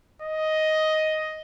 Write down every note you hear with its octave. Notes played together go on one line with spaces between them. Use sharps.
D#5